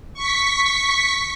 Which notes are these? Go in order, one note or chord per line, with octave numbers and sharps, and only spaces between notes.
C#6 B6